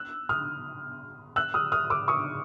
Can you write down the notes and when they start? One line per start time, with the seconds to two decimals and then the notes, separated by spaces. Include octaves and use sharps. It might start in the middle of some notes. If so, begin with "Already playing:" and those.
Already playing: E6 F#6
0.29 D#6 F6
1.36 E6 F#6
1.54 D#6 F6
1.72 D#6 F6
1.90 D6 E6
2.08 C#6 D#6